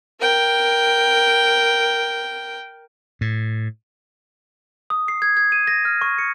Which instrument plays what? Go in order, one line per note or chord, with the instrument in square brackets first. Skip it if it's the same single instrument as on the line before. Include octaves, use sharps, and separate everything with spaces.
[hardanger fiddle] A#4 G5
[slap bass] A2
[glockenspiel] D#6
C7
G#6
G#6
D#7
A#6
F6
C#6
C#7